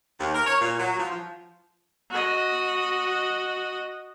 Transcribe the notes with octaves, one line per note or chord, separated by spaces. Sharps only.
D#2
A#4
C#5
A#2
F#3
F3
F3
F#4 D#5